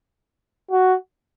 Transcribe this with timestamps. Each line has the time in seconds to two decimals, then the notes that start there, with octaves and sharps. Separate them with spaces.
0.71 F#4